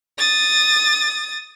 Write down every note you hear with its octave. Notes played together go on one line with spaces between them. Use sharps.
D#6 A6